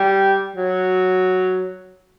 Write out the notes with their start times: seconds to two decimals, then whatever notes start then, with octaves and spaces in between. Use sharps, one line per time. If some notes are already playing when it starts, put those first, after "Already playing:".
Already playing: G3
0.56 F#3